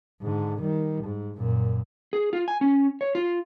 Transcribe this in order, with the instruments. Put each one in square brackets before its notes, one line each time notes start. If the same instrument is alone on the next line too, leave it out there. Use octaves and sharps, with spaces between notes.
[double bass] G#2 D3
D#3 G3
G#2
F#2 A#2
[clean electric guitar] G#4
F4
G#5
C#4
C#5
F4